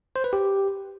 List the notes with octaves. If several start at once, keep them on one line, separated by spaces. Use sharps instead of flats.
C5
B4
G4